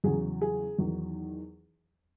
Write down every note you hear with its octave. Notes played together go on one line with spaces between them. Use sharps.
E2 C#3 F#3 G#4
G#4
E2 D#3 F#3